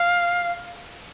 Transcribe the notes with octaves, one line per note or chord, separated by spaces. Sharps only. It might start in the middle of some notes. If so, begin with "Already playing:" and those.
Already playing: F5